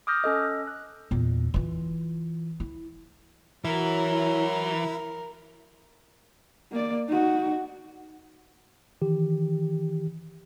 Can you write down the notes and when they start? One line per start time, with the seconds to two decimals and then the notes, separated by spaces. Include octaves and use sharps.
0.07 D6 D#6 F6 G6 A#6
0.24 C#4 A4 D#5
0.67 F#6
1.11 E2 A#2
1.54 E3 F4
2.60 E4
3.65 E3 F#3 E4 A#4
6.71 A#3 D5
7.08 D#4 F#4
9.02 D#3 E3 G4